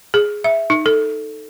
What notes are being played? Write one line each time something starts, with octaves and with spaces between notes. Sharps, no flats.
G#4
E5
D#4
A4